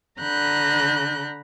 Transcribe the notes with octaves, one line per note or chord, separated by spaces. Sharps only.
D3 A#5 B5 F#6 G6